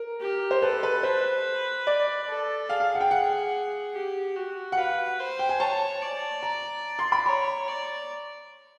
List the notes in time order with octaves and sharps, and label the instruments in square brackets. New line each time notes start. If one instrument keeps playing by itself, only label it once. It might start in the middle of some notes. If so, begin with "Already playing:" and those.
Already playing: [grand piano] A#4
[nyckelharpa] G4
[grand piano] C5
[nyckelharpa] A4 [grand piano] B4
[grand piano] B4
[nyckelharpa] B4 [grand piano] C5
[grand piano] D5
[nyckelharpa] A4
[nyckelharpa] G#4 [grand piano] F5
[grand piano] F5
F#5
G5
F#5
[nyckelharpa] G4
F#4
[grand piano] F#5
[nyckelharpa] B4 [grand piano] F5
[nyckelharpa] C5
[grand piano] G5
G#5
[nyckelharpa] C#5 [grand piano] A5
[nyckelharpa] D5
[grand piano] A#5
C6
B5
[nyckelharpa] C#5 [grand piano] A#5
[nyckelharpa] D5